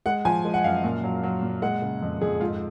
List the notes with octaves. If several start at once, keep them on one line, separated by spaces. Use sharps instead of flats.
G#3 F#5
F3 G#5
G#3
F#5
F#2 F5
A#2
F#3
F#3
A#2
G#3 F#5
C#3
F2
F2 G#4
G#2 F4